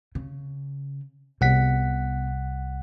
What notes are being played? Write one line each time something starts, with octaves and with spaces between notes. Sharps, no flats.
C#3
C2 C3 B3 F#5 B6